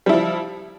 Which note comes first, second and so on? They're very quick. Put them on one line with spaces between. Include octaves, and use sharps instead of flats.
G3 E4 F3